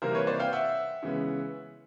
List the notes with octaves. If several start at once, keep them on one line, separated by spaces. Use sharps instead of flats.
C3 E3 G3 A#3 A#4 C5
B4 C#5
C5 D5
F5 G5
E5 F#5
C#3 E3 G#3 B3